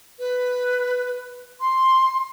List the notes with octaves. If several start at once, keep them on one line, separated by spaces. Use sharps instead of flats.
B4
C6